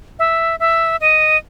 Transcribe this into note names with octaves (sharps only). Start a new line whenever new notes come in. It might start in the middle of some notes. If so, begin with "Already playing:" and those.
E5
E5
D#5